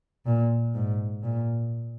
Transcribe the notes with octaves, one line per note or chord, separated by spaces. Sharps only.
A#2
G#2
A#2